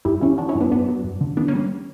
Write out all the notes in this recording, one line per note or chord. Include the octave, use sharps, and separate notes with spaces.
G2 E4 G4
E3 C#4 E4
E3 D4 F#4
C#4 E4
G2
B3 D4
G2 B3 D4
F#3
G2
D3
E3 B3 D4
A#3 C#4
G3